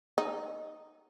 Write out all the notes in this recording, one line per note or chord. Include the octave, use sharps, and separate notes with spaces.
D#4